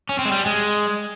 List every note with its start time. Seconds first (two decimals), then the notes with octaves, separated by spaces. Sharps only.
0.09 C#4
0.19 C4
0.25 G#3
0.32 G3
0.46 G#3